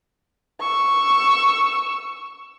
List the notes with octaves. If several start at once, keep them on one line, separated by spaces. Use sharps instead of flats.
C#6 E6